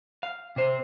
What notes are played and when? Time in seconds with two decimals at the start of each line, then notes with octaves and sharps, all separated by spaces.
0.23 F5
0.56 C3 C5